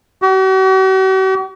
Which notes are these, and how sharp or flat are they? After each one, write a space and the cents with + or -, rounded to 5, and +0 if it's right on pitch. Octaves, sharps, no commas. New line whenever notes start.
F#4 +45